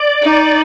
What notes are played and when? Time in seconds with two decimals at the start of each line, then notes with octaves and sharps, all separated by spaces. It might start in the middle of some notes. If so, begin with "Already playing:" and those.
Already playing: D5
0.22 D#4